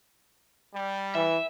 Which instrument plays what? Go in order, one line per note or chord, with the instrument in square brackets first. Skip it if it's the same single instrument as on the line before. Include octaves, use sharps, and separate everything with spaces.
[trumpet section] G3
[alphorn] E3 [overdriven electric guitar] E5